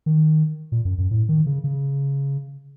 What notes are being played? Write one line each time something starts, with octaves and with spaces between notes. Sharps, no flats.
D#3
A#2
F#2
F#2
A2
D#3
C#3
C#3